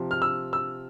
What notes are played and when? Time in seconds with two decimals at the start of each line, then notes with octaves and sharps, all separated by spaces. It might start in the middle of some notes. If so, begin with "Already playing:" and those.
Already playing: C3 F3
0.11 F6
0.22 E6
0.53 E6